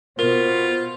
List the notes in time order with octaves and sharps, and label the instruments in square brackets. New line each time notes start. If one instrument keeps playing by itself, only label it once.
[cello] B2 [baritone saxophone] F4 [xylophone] A#4 [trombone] C5